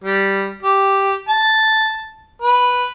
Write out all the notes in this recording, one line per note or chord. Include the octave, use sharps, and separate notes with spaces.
G3
G4
A5
B4